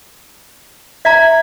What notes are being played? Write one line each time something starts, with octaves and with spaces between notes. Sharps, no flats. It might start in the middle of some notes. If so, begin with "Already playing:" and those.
E5 A#5 G#6 B6